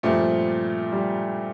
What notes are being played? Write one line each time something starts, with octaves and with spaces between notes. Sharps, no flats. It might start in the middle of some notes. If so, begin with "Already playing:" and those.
G2 A#2 F3 G3 A3 C4
G3